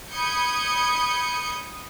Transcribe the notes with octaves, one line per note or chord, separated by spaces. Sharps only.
B5 D#6 G6 G#6 C#7